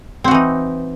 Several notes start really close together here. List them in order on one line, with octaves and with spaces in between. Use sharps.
C4 F#4 E3 D#4